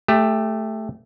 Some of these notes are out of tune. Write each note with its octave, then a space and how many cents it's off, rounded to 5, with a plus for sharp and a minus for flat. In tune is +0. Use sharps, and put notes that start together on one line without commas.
A3 +0 G4 +20